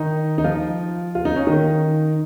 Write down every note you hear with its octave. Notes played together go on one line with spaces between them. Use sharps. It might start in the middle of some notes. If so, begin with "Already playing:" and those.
Already playing: D#3 D#4
D#4
F3 F4
F4
D#4
C#4
D#3 D#4